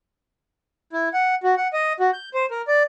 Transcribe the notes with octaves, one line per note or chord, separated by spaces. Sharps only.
E4
F#5
F#4
F#5
D#5
F#4
G6
C5
A#4
D5